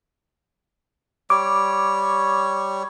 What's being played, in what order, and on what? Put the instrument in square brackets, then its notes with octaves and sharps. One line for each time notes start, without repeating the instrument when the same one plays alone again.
[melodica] G3 C#5 [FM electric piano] D6